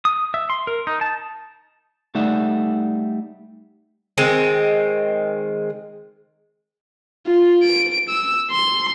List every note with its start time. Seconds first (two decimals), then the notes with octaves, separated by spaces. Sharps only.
0.05 D#6
0.34 E5
0.50 C6
0.67 A#4
0.87 D#4
1.01 A5
2.15 G3 A3 D#4 D5 E5 F#5
4.18 D#3 G#3 C4
7.27 F4
7.64 D7
8.10 E6
8.51 C6